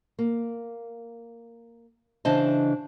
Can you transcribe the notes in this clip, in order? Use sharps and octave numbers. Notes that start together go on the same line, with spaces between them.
A#3
C#3 E3 D4 C5 D#5 A5